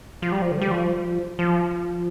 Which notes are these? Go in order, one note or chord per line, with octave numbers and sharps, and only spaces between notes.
F3
G3
F3
D3
G3
F3
F3